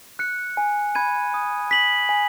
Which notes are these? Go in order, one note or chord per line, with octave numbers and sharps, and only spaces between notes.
F#6 C#7
G#5
B5 G#6 D#7
D#6
B6 F#7
G#5